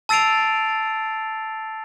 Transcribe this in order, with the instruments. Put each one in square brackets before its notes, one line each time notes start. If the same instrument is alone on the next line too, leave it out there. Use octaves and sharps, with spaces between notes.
[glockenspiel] A5 E6 A6 C7 D7 F7